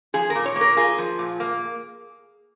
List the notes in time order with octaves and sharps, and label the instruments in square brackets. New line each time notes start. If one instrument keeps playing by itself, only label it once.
[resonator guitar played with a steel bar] F3 G#4
A#4
A#2
C#5
A#3
A#4
F4 G#4
F3
A#2
A#3